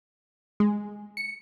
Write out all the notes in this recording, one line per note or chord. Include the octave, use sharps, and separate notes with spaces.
G#3
C#7